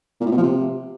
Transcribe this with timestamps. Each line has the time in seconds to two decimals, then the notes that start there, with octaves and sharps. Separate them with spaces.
0.20 A#2
0.26 A2
0.32 B2
0.37 F3
0.43 C3